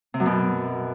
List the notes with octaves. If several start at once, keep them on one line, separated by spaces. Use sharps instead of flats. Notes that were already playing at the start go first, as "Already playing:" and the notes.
C3
F#2
B2